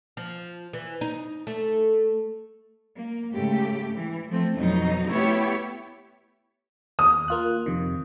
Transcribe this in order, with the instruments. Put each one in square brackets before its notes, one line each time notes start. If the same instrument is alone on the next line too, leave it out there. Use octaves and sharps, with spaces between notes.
[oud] F3
E3
D#4
A3
[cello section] A#3
G#2 C#3 A3 G4
E3
F3 A3 C4
F2 B2 F#3 D#4
A3 B3 E4 G4 C#5
[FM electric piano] D#2 [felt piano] D#6
[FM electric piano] A#3 F4 F#6
F2 C3 D#3